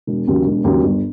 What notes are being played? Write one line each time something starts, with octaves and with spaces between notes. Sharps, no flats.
E1
D#2 C#3 F#3
E1
D#2 C#3 F#3
G1